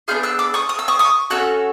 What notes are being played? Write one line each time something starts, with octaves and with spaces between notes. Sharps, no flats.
B3 D4 F4 G#4 F6 G6
E6 F#6
D6 E6
C#6 D#6
D#6
E6
C#6 D#6
C#6 D#6
C#4 F#4 A4 E6 F#6